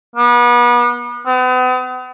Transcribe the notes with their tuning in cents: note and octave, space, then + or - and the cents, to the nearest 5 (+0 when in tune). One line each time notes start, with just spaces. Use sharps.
B3 -35
B3 +45